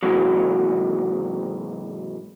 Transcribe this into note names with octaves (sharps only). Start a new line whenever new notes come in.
G#2 C3 E3 F#3